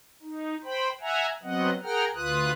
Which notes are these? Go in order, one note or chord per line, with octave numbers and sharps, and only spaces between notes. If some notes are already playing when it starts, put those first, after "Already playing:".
D#4
C5 G5 B5
E5 F#5 G#5 A#5
F#3 B3 C4 D#5 F#5
G#4 A#4 F#5 G5 A#5 F6
D2 F4 B4 D#6 F#6